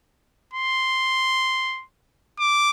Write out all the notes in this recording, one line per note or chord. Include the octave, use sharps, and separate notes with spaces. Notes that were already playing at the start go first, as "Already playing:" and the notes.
C6
D6